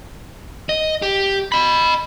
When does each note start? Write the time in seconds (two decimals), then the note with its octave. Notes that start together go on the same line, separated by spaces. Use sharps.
0.69 D#5
1.02 G4
1.52 D#5 B5